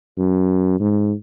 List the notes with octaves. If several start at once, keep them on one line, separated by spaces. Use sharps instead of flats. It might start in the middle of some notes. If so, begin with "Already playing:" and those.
F#2
G#2